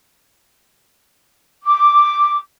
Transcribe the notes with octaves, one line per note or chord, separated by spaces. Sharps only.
D6